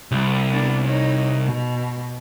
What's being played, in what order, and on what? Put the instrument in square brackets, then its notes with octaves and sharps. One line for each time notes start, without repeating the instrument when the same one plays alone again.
[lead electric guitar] C2 [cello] G3
[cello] B3 D4
D#4 C#5
B2